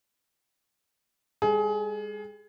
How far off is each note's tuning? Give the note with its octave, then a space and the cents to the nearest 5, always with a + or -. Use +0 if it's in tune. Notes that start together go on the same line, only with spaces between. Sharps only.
G#3 -45 G#4 +30